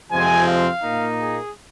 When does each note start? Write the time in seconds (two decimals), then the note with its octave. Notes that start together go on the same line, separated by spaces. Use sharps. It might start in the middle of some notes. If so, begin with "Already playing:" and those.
0.11 F2 C3 F3 G#3 C4 G#5
0.48 F5
0.82 A#2 A#3 D#4
1.17 G#4